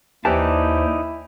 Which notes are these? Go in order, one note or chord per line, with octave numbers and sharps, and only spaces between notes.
D#2 E3 D#4 E4 G4 C5 D5 A5